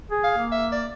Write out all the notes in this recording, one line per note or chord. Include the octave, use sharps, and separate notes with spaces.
G#4
F5
A#3
E5
D5